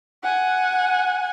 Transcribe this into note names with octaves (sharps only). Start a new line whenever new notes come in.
F#5 G#5